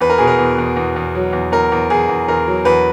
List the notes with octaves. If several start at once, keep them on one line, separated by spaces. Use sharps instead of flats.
E2 B4
A#4
B2 G#4
A#4
E2
E2
E2
E2
F#3
E2
E2 A#4
E2
E2 G#4
E2
E2 A#4
F#3
E2 B4